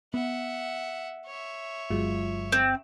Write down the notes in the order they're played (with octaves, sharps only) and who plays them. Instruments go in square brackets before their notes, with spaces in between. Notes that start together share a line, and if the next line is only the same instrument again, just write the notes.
[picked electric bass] B3 [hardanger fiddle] E5 F#5
[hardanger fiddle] C#5 E5
[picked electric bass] G1 [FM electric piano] F#3 G#3 F4
[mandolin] C4